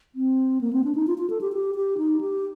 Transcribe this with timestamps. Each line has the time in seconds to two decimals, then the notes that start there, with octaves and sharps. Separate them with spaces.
0.15 C4
0.61 A#3
0.73 C4
0.84 D4
0.95 D#4
1.07 F4
1.18 F4
1.30 A4
1.41 G4
1.52 G4
1.75 G4
1.98 D#4
2.21 G4